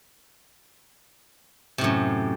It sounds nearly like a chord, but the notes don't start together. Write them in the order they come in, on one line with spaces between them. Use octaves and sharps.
C3 A2 F#2